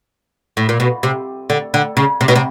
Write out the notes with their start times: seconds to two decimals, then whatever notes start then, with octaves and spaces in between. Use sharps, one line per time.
0.57 A2
0.69 A#2
0.80 B2
1.03 C3
1.50 D3
1.74 D3
1.97 C#3
2.21 C3
2.28 B2
2.36 C3